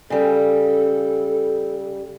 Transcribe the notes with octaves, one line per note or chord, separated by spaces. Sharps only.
C#3 G3 A4